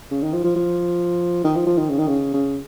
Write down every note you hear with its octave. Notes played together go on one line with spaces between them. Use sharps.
C#3
D#3
F3
F3
F3
D#3
F3
F3
D#3
C#3
D#3
C#3
C#3